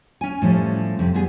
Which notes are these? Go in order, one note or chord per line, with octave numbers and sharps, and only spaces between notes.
C#4 G#5
A2 F3 G3 C#4
F2 C3
G3 B3 G#4